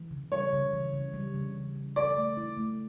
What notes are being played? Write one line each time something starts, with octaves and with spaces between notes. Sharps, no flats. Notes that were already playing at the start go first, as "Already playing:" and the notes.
Already playing: E3
C#3
G3 C#5
C#3
E3
C#3
G3
C#3
E3
C#3
A4 D5
A3
E4
A3